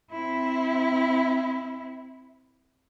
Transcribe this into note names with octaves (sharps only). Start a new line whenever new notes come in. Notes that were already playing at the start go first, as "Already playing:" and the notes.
C4 E4